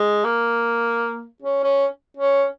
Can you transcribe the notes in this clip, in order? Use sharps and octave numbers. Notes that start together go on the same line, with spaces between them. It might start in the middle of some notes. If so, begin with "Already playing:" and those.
Already playing: G#3
A#3
C#4
C#4
C#4